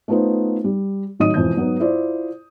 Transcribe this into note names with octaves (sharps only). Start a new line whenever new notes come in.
A3 B3 D#4 F4 B4 C5
G3
A1 D#3 F#3 D#5 D#6 D#7
E1 F2 E3 G6
G#2 F#3 B3 D#4
E4 F4 C5 D5